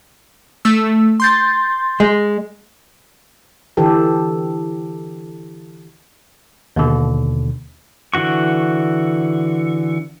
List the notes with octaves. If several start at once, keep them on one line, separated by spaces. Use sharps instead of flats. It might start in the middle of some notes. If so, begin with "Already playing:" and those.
A3 E6
C6 G6 A6
G#3
D3 E3 G4 A4
D#2 B2 D3
D3 E3 F#4 C#6